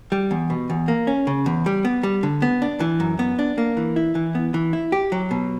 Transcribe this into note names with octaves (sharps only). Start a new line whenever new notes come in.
G3
E2
B2
E2
A#3
C#4
C#3
E2
G3
B3
G3
D3
B3
D4
E3
F#2
B3
D4
A#3
E3
E4
E3
B3
E3
E4
G4
F#3
B2